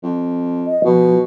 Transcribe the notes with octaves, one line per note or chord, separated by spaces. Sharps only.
F2
D#5
B2 F3